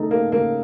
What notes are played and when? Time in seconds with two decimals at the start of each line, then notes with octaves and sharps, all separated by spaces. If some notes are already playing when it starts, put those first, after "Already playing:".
Already playing: C#3 A3 D#4 A4
0.11 A#3
0.32 C#3 A#3